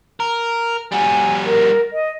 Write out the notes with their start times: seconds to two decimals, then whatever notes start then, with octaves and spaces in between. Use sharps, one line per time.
0.20 A#4
0.92 G3 F#4 G#5
1.46 A#4
1.93 D#5